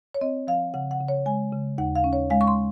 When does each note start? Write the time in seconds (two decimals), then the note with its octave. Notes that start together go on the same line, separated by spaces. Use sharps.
0.14 C#5
0.21 C4 D#5
0.48 F3 F5
0.74 C#3 F#5
0.91 F#5
1.00 C#3
1.08 C#5
1.26 G#3 G#5
1.52 C#3
1.78 D#2 F#5
1.95 F5
2.04 C#4
2.13 C#5
2.30 G#3 F5
2.41 C#6
2.47 C6